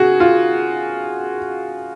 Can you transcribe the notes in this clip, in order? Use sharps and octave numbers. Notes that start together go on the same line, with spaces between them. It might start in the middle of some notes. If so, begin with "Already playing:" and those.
Already playing: C#3 F#4 G#4
F4